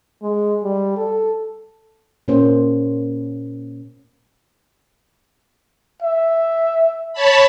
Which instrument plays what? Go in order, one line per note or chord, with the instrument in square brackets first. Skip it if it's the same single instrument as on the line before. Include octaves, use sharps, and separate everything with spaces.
[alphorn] G#3
G3
A4
[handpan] A#2 A#3 C#4 C5
[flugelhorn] E5
[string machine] C#5 A5 B5